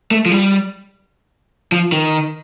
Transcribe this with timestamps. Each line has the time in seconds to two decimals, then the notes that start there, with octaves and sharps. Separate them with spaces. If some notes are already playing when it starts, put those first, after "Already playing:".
0.11 A3
0.26 F3
0.32 G3
1.72 F3
1.92 D#3